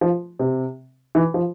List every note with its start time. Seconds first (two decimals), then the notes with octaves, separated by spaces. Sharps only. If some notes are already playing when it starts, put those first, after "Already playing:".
0.01 F3
0.39 C3
1.15 E3
1.34 F3